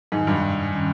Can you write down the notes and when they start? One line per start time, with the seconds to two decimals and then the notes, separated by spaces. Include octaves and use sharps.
0.12 F2 G#2 C3 D#3 G#3 D#4
0.27 G2
0.72 D#3 G3 C#4